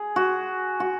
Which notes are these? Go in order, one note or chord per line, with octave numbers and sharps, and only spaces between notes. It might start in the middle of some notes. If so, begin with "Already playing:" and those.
Already playing: G#4
F#4
F#4